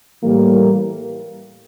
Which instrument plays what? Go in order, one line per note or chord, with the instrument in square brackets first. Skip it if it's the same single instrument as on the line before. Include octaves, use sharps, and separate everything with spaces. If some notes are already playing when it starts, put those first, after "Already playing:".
[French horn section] A2 E3 G3 A#3